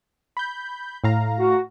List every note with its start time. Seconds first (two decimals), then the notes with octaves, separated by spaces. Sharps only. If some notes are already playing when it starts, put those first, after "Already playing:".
0.37 B5 G6
1.04 A2 F5 A#5
1.39 F#4